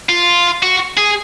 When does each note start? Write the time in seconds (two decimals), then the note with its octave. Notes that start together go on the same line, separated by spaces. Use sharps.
0.09 F4
0.63 F#4
0.98 G#4